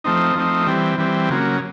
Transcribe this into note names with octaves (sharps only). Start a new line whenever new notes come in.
F3 A3 C4 D#4
F3 A3 C4 D#4
E3 G3 C4
E3 G3 C4
C#3 F#3 A#3